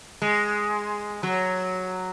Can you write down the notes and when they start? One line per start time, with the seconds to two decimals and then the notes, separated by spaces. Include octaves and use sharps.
0.22 G#3
1.23 F#3